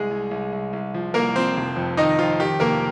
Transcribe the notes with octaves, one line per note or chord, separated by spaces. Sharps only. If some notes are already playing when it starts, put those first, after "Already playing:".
Already playing: C2 G#3 G#4
C2
C2
C2
C2
F3
C2 A#3 A#4
F3 C4 C5
F1
F2
D#3 D#4 D#5
F2 F4
D#3 G4
F1 A#3 A#4